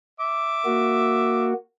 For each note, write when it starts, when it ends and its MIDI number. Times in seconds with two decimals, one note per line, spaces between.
0.20 1.50 76
0.20 1.50 86
0.65 1.53 58
0.65 1.53 66